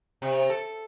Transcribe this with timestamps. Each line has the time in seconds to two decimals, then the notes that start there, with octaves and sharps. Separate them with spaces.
0.22 C3
0.50 A4